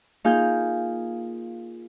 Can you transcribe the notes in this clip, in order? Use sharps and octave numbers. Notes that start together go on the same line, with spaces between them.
A#3 D#4 F4 G#4 F5 G6